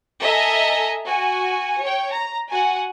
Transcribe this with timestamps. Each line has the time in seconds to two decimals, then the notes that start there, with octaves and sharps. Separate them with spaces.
0.22 A4 D#5 E5 G#5 A#5
1.05 F#4 G#5
1.80 C#5 G5
2.10 A#5
2.49 F#4 F#5 G#5